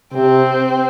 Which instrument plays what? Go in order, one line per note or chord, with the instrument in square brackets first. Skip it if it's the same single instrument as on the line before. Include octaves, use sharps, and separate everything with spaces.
[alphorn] C3 [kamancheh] C4